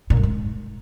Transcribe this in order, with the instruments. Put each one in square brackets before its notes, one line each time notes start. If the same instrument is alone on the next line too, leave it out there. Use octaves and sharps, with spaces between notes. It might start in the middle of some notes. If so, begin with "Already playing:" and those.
[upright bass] A#2
F#2
G#2